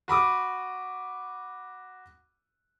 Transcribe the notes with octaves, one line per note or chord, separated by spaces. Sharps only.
F#4 B5 D6 D#6